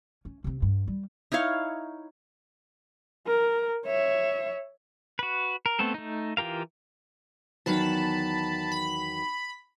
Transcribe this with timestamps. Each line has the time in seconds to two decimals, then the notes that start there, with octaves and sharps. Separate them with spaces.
0.25 C#4
0.44 C3 C4
0.62 G2
0.87 G3
1.32 D#4 E4 C#5 F5
3.27 A#4
3.86 C#5 E5
5.19 F#4 B4
5.66 A#4
5.79 A3 B3 C4 A4
5.94 A3 D#4
6.37 E3 F4 G4 A#4 F5
7.66 E2 D#3 F#3 A5 B5
8.72 B5